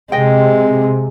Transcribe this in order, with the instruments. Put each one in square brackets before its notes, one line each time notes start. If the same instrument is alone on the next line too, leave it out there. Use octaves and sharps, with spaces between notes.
[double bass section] C3 [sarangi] G#3 [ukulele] D#5 G5